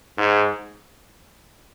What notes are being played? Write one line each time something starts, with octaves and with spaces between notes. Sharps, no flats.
G#2